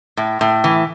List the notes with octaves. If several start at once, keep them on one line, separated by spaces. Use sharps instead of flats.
A2
A2
E3